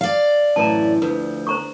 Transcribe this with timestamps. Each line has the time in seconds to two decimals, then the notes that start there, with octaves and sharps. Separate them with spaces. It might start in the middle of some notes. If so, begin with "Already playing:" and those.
0.01 D5 F5
0.56 F#2 A2 E3 A5 A#5
1.02 D2 F3 B4
1.47 C5 A#5 C#6